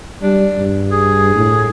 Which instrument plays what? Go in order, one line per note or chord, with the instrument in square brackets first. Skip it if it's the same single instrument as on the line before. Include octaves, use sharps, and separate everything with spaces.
[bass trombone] G3 [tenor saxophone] D4
[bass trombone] G2
[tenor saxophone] G#4
[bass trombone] A2